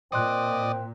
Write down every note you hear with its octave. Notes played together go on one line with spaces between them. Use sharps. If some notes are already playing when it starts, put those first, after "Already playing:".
A#2 C4 D5 D#5 G5 C6 F#6